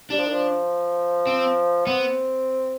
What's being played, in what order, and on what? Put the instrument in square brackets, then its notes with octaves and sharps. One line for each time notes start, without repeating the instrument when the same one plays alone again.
[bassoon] G3 [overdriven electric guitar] D4
[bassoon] F3
D#3
F3
[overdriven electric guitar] C4
[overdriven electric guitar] B3 [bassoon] C4